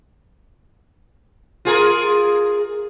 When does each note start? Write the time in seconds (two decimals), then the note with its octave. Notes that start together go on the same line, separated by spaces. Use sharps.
1.65 F4 G#4 A#4